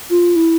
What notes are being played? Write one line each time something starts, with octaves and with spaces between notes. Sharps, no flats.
F4
E4